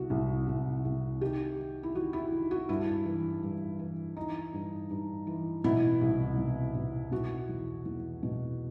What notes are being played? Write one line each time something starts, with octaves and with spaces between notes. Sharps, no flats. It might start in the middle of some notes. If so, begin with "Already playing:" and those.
Already playing: C2 F#4
C2
C2
C2
D#3 G4
D#3
E4
D#3 F#4
E4
D#3
F#4
G2 E4
E3
G2
E3
E3 D#4
G2
G2
E3
B2 E4
C2
B2
B2
B2 F#4
E2
E2
B2